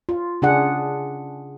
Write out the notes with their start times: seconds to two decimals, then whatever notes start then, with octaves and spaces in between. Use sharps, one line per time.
0.09 F4
0.42 C#3 D4 G#4 F#5